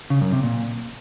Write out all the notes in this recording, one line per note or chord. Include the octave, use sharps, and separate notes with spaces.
C#3
F#2
C3
A#2